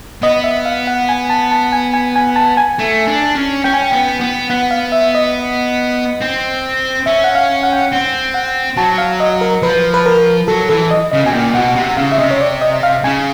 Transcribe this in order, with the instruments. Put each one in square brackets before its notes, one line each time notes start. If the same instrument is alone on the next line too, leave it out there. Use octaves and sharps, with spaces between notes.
[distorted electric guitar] B3 [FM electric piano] D#5
[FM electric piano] E5
F5
F#5
G#5
A5
A5
G#5
G#5
G#5
A5
G#5
[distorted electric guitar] A3
D4
C#4
[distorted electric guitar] C#4 [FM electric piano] G5
[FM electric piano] G#5
G5
[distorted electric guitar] B3
B3
[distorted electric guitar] B3 [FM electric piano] F#5
[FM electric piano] F5
E5
D#5
[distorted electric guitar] C4
[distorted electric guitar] C#4 [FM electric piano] E5
[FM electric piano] F#5
F5
F#5
G5
F#5
[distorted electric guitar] C4
[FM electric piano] F#5
[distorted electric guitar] F#3 [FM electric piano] A5
[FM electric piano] F5
D#5
A#4
[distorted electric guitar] F3 [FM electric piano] B4
[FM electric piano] B4
A#4
[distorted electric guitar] F#3 [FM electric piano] A4
[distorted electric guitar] E3 [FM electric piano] A4
[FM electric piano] D#5
[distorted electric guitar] C#3 [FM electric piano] D#5
[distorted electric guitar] B2 [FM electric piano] G#5
[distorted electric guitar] A#2 [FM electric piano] G5
[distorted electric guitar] B2 [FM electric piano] F#5
[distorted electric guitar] C3 [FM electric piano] F#5
[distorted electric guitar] C#3 [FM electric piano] F5
[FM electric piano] E5
[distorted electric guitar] C3 [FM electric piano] D#5
[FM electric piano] C#5
D5
D#5
F5
[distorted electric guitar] C#3 [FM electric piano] G#5